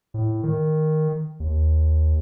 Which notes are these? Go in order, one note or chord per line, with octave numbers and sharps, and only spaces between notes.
A2
D#3
D#2